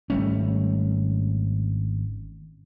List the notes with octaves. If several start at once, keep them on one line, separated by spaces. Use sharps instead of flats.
G#1 G3 A3 C#4